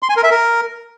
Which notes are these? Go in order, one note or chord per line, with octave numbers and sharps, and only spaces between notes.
C6
G#5
A#4
E5
A#4